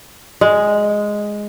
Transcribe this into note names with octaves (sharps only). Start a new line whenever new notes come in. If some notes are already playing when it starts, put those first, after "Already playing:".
G#3